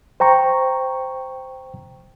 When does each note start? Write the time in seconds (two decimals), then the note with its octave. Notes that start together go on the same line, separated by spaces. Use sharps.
0.20 C5 G5 A#5 C#6